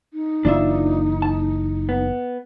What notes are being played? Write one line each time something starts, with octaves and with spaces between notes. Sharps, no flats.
D#4
F#1 E3 A#3 D4 F4 E5
A5
B3